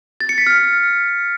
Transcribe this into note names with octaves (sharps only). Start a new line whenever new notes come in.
A6
C#7
B6
F6